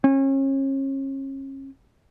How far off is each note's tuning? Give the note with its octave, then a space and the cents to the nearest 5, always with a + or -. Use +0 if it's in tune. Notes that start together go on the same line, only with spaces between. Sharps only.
C#4 -35